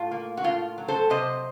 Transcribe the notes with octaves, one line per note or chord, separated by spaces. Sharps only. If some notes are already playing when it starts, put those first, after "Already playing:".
Already playing: A2 F4
A#3
F#4
A2 F4
F#3
A4 C5
C3 C5 D#5